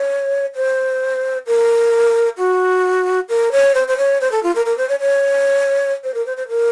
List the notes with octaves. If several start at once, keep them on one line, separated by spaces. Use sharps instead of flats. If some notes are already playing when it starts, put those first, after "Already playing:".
Already playing: C#5
C5
A#4
F#4
A#4
C#5
C5
C5
C#5
C5
A4
F4
A#4
A#4
C5
C#5
C#5
C5
A#4
C5
C5
A#4